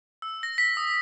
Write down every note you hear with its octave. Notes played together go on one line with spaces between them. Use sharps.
E6
A#6
B6
D#6